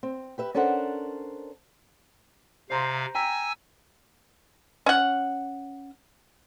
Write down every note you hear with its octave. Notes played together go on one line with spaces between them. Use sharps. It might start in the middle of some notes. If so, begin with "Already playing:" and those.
C4
G4 B4 E5
C#4 D4 A4 A#4 C5 F#5
C3 C5 F5 A#5 C6
G5 G#5 A#5 E6 B6
C#4 F#5